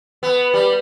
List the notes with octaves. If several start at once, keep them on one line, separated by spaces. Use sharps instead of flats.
B3
G3